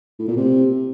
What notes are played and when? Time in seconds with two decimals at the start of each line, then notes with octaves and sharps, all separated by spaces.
0.19 A2
0.28 A#2
0.37 C3